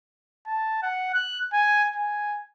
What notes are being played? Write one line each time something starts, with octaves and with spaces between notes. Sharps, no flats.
A5
F#5
F#6
G#5
G#5